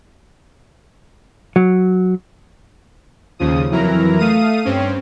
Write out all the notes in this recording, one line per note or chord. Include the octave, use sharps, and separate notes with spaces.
F#3
D#2 C#3 F3 D#6
F2 E3 F#3 E4 A#4 A#5
A3 F5 D#6 D#7
G2 C4 C#4